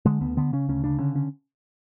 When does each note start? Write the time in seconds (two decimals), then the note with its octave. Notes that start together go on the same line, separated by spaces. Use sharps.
0.05 D3 G#3
0.21 D2 B3
0.37 D3 B3
0.53 C#3 C#4
0.69 D2 C#4
0.84 C#3 D4
0.99 D3 C#4
1.16 C#4